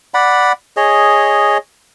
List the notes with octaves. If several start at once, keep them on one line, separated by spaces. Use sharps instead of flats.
D5 F#5 B5
G#4 C#5 D#5